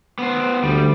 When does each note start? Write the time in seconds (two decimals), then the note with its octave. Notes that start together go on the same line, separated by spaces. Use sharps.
0.19 B3 C5
0.63 D2 G3